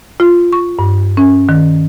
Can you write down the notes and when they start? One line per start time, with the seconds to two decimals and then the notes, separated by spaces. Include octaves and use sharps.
0.20 F4
0.53 C#6
0.79 G2
1.17 C#4
1.49 D#3